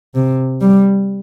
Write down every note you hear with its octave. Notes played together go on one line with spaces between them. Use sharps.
C3
G3